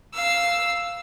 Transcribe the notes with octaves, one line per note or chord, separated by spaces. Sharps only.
F5 E6